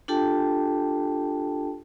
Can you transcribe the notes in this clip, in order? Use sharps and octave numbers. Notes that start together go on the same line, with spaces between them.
D4 F4 G4 A4 G5 A5